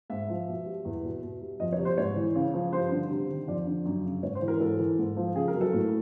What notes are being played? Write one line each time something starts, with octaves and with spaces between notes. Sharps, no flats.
G#2 E5
F3
B2
G3
E2
B2
B2
G3
F2 D#5
C#5
C3
C5
G#2 C#5
E3
C#3
F3
G2 C5
D3
C3
D#3
F2 D5
D3
F#2
C#3
G#2 C#5
C5
E3
A#4
G#2 A4
E3
G#2
F3
C#3 G#4
A#4
F#3
A4
A2